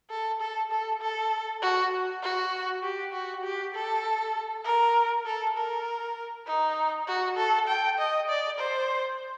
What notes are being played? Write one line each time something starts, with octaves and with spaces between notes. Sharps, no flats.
A4
A4
A4
A4
F#4
F#4
G4
F#4
G4
A4
A#4
A4
A#4
D#4
F#4
A4
G5
D#5
D5
C5